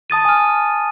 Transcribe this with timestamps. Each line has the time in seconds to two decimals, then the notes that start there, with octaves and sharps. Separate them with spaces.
0.10 A5 D#6 A6 D#7
0.25 G#5 F6